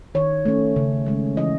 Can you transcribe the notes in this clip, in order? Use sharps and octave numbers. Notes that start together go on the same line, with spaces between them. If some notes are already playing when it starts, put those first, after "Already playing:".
D#3 C#5
A3 C#4
C#3
G#3 C#4
E3 D#5